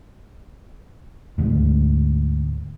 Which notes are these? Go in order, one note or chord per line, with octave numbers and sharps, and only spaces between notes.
D2 G#2